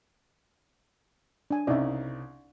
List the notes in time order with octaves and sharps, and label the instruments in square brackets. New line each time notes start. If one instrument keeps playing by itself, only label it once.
[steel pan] D4 G#5
[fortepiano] C2 C#3 D#4 [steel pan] D5 E5